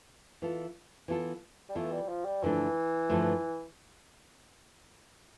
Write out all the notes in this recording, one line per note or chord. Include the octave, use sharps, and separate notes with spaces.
E3 B3 F4 A4
E3 B3 F4 A4
G3
E3 A3 B3 F4 A4
G3
F3
G3
G2 D3 E3 F3 A3 D4
G2 D3 F3 A3 D4